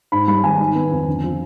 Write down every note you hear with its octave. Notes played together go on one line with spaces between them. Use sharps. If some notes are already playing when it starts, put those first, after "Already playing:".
G#2 B5
G3 B5
G#1 G#5
D#3
B3
F2
D3
F3